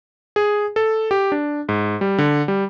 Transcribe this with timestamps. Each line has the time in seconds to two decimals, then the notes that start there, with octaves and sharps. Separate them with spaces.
0.36 G#4
0.76 A4
1.11 G4
1.32 D4
1.69 G#2
2.01 G3
2.18 D3
2.48 G3